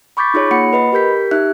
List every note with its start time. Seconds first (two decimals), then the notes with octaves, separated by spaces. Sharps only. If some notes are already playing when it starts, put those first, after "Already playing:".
0.17 B5 C#6 D6 G6 A6 B6
0.34 D#4 F4 G#4 C#5
0.51 A#3 F4 F#5 B5 C#7
0.73 B4 D#5 B5
0.92 G4 A#4 G6 B6
1.31 D#4 G4 E5 F#6